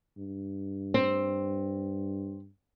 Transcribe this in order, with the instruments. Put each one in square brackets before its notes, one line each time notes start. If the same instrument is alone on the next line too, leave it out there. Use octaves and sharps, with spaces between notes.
[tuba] G2
[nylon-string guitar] C4